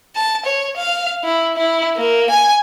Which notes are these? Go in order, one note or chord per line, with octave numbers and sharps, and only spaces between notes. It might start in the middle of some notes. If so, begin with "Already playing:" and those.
A5
C#5
F5
E4
E4
A#3
G#5